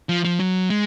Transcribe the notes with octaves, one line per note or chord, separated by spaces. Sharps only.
F3
F3
F#3
G#3